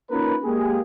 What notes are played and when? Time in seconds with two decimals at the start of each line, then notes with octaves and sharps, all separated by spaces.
0.10 A#3 C#4 D#4 F4 A#4 B4
0.45 G#3 A#3 G4 G#4